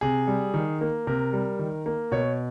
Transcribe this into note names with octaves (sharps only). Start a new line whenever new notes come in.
C3 G#4
G3
D#3
A#3
C3 A#4
G3
D#3
A#3
B2 C#5